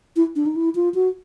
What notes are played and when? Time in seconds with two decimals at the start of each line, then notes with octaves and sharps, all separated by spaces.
0.16 E4
0.36 D4
0.46 D#4
0.56 E4
0.75 F4
0.94 F#4